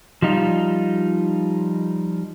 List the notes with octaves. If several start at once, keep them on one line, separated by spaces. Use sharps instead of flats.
F3 G3 D#4 F4